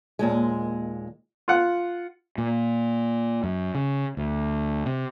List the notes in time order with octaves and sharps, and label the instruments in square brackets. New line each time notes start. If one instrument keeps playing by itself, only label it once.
[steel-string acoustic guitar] D#2 A#2 G#3
[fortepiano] F4 F#5
[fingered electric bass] A#2
F#2
C#3
D2
C3